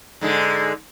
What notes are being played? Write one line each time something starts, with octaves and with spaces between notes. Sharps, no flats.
G#2 D3 G#3